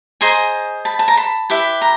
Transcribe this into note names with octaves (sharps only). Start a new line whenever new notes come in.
G#4 C5 D#5 G#5 A#5
A5 B5
A5
A#5
A5 B5
E4 G4 B4
A#5